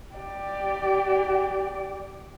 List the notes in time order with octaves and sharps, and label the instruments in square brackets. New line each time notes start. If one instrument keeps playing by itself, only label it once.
[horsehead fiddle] G4 D5